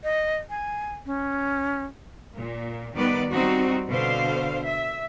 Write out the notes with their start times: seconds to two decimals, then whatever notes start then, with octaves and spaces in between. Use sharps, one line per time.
0.04 D#5
0.50 G#5
1.06 C#4
2.36 A#2
2.96 D#3 G3 B3 B4 D5
3.30 G3 C4 D#4 F#4
3.89 B2 D3 C5 F5
4.64 E5